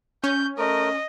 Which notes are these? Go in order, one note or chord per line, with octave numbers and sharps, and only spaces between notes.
C#4 G6
A3 A#4 D#5